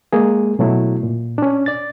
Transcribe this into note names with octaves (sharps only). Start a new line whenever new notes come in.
G#3 A#3 G#4
B2 F#3 A3 E4
A#2
C#4 D4
D5 A6